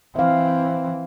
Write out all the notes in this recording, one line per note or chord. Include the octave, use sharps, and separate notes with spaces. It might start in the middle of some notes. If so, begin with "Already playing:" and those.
E3 C4 E5 F5